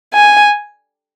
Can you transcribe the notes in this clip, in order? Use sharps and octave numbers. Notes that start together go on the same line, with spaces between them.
G#5